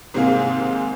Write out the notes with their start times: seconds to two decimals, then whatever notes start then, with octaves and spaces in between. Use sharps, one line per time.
0.14 G#2 C3 D#3 A#3 G#4 F5